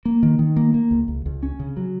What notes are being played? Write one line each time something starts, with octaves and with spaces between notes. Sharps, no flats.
A#3
D#3
D#3
A#3
A#3
C#2
C#2
C#2
C#4
C#3
F#3